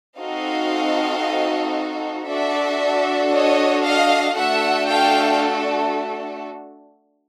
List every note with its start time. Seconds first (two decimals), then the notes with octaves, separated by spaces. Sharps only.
0.18 C4 D#4 F#4 A4 D#5 F5
2.27 D4 F#4 A4 D5 E5
3.32 C#5 D#5
3.84 D#5 F5
4.36 A3 D4 F#4 A4 E5 F#5
4.88 F5 G5